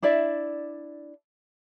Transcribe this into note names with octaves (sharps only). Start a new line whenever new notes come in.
D4 E4 D5 E5